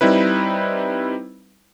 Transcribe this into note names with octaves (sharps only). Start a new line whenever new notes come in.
G3 C4 D#4 E4 B4